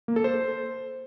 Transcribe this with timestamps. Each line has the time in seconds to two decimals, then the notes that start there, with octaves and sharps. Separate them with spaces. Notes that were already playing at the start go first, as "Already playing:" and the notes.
0.08 A#3
0.16 A4
0.24 C5